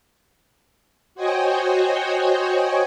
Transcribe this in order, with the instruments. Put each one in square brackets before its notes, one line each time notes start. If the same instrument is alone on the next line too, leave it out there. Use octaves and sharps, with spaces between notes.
[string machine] F#4 C5 C#5 D#5 G5 G#5